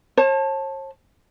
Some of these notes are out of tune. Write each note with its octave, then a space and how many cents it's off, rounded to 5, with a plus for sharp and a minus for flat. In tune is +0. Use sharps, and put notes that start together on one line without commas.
C#5 -45 A5 +0